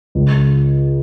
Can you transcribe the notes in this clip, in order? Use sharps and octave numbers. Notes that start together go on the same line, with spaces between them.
C#2